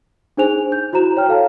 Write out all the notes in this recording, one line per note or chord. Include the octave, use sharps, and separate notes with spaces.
D4 D#4 G#4 C5 G#5 F7
G6
E4 F#4 C5 A#5 E7
C#5 G5 F6
A4 F5 A5